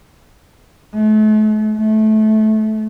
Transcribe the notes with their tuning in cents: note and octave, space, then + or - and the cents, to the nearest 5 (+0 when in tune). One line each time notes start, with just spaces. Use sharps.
A3 -40
A3 -20